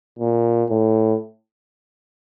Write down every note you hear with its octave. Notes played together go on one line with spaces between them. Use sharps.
A#2
A2